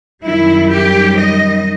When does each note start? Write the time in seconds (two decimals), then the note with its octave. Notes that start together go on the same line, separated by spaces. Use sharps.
0.24 F#2 D#3 G3 E4
0.72 G4
1.19 D#5